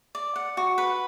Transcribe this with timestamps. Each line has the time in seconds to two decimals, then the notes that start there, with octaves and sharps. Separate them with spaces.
0.15 D5
0.36 F#5
0.57 F#4
0.78 B4